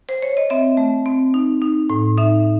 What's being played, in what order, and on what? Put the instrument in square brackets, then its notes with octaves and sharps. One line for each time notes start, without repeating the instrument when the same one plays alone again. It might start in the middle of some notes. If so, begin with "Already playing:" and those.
[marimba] C5
C#5
D#5
C4 E5
A3
C4
D#4
D#4
A2
D#4 E5